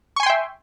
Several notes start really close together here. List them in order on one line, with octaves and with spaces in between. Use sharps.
C#6 G#5 C6 G5 E5